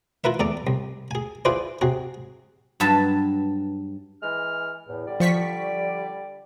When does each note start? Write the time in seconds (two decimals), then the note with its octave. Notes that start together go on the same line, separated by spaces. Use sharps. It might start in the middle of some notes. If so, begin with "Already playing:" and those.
0.24 E4 F4 A#4 B4 E5
0.40 E2 A4 D5 A#5
0.67 C2
1.11 G#4 G#5
1.45 E4 F4 G#4 B4 C5 D5
1.81 C3 F#4 G#4
2.80 G2 F#3 B4 A5
4.22 E3 G#3 F6
4.87 E2 A2
5.07 D3 G3 D5
5.20 F3 C#6 B6